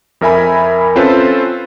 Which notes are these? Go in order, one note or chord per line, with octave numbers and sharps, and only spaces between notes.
F2 A#4 E5 G#5 B5
C4 C#4 F4 A4 B4 C5